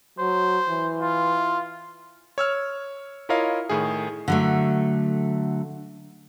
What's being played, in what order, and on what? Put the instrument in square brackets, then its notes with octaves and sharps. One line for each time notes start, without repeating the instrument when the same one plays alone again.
[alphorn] F#3 [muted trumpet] C5
[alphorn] E3
[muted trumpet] F4
[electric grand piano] C#5 E6 F6
E4 F4 A#4 C#5 D#5 F5
A2 D#3 G#4
[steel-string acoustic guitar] D3 F#3 A3